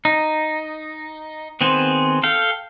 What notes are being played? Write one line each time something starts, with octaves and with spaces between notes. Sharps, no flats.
D#4
D#3 B3 C4 G#4 C5
A4 F5 G5